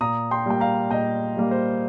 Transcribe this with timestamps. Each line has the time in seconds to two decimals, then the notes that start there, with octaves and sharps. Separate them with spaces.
0.01 A#2 A#5 D#6
0.31 G5 C6
0.46 G3 A#3 G5
0.60 F5 A#5
0.90 A#2 D#5 G5
1.37 G3 A#3
1.51 C5